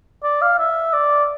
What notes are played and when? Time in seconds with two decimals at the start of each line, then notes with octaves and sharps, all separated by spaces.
0.23 D5
0.42 F5
0.59 E5
0.93 D5